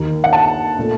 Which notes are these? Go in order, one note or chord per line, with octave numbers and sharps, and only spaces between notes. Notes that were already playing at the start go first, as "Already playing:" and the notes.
Already playing: D#2 D#3 A#3 D#4
F#5
A5
A#2 A3